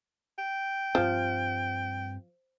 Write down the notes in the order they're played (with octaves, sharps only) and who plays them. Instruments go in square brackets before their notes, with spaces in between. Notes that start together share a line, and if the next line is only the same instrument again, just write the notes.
[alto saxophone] G5
[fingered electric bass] G2 C4 [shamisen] F3